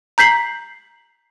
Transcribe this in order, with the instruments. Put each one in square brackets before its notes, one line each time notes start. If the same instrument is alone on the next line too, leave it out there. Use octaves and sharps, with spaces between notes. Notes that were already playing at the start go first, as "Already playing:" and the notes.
[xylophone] A#5 G6 B6 C7 F#7